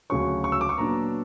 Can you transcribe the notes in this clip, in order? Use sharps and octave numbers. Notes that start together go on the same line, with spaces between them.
D2 C#3 F#3 C#4 C#6
C#6
E6
D6
C#6
A#2 F#3 B3 D4 A#5